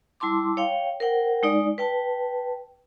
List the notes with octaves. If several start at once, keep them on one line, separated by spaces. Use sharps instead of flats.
G3 E4 A5 C6 D6
C#5 F5 G5
A#4 C5 F#5 G5
G#3 D#4 D5
B4 G5 A5